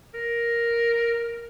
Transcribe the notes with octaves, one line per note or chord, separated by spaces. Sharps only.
A#4